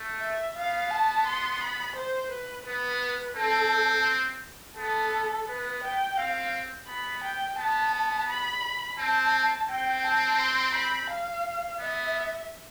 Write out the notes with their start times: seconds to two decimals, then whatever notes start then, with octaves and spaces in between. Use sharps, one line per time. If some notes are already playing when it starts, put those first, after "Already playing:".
Already playing: A3
0.21 E5
0.56 B3 F5
0.91 A5
1.26 C6
1.61 B5
1.96 C5
2.32 B4
2.67 B3 B4
3.36 C4 A4
4.77 B3 A4
5.48 B3 B4
5.83 G5
6.18 C4 F5
6.88 B3 B5
7.24 G5
7.58 B3 A5
8.28 B5
8.99 C4 A5
9.69 C4 G5
10.04 A5
10.39 C6
10.74 B5
11.10 F5
11.80 B3 E5